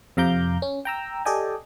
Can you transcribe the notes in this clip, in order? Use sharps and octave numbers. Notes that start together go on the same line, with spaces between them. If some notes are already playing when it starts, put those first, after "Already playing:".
F2 C3 F5 A#5 D6 G6
C#4
G5 A#5 E6
G4 A4 D5 D#5 G5 G#5